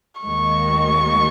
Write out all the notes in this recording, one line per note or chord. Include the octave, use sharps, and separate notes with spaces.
D#2 D#3 G#3 C#6